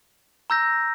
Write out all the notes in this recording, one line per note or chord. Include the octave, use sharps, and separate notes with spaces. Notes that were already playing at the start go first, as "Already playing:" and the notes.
A#5 E6 G6 A#6